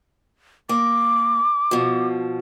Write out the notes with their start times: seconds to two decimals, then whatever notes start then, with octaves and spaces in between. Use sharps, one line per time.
0.69 A#3 D6
1.71 B2 F3